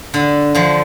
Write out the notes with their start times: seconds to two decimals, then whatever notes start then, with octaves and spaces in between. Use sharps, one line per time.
0.14 D3
0.55 D3 F3